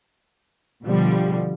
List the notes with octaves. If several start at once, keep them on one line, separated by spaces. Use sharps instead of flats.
B2 D3 F3 G3